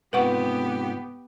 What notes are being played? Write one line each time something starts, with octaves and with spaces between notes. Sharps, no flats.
G#2 C3 B3 F4 G4 B4 F#5 C#6